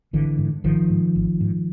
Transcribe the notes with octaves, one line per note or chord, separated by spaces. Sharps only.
G#1 D3 E3
G#2
G#1 D#3 F3
G#2
G#1
G#2